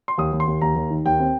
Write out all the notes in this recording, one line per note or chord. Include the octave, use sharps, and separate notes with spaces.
C6
D#2 D#6
D#2
C6
D#2
D#2 A#5
D#2
D#3
D#2 G5
C4